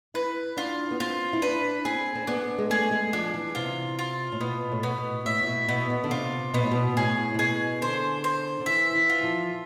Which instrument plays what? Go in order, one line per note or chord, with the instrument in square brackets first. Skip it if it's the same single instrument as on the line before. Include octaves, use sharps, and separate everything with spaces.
[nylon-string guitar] E4 [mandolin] B4
[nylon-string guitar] D4 [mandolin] F4
[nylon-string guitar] B3
[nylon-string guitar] C4 [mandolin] F4
[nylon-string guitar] E4
[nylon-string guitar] D4 [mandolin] B4
[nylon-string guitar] C4 [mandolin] G#4
[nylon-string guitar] C4
[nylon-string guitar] B3 [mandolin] D4
[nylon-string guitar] G#3
[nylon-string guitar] A3 [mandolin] G#4
[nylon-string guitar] G#3
[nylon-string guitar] F3 [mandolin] D4
[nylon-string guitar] E3
[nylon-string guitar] C3 [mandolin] F4
[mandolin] F4
[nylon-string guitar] A2
[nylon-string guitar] B2 [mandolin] B3
[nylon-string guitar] A2
[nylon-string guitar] B2 [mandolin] B3
[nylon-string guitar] A2 [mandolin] E5
[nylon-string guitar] A2
B2
[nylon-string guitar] B2 [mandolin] B3
[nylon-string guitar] B2
D3
[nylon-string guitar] C3 [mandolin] F4
[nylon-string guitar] B2 [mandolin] B3
[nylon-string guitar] A2
B2
[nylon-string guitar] A2 [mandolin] G#4
[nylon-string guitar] C3
[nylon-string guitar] B2 [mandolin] G#4
[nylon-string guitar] D3 [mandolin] C5
[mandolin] C5
[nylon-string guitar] D3
[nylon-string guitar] E3 [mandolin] E5
[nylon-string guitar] E3
[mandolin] F4
[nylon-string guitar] F3